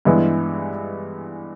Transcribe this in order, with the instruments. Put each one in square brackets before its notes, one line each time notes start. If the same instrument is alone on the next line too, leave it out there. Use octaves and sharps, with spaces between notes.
[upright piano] G2 E3 G#3 B3 E4